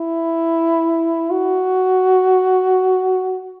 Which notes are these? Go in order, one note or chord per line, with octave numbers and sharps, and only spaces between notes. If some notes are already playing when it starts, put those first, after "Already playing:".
Already playing: E4
F#4